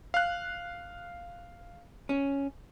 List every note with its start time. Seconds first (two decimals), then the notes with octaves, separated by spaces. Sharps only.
0.14 F5 F#6
2.09 C#4